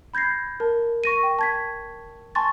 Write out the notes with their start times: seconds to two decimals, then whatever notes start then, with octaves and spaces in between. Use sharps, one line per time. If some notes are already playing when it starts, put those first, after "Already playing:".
0.14 B5 G6 G#6 A#6 C7
0.60 A#4 A5
1.04 C#6 A#6 D#7
1.23 G5
1.39 A5 G#6 B6
2.35 G#5 A5 C6 C#6 A6